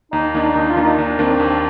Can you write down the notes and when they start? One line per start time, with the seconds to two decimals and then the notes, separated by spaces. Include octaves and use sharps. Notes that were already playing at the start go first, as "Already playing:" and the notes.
0.12 D#2 D#4
0.34 D#3 A#3 D4 D#4
0.55 D#2 D#4
0.70 F4
0.76 D#3 A#3 D4
0.83 D#4
0.98 D#2 D4
1.19 D#3 A#3 C4 D4
1.40 D#2 C4